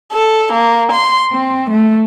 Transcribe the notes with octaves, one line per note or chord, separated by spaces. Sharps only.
A4
A#3
C6
C4
A3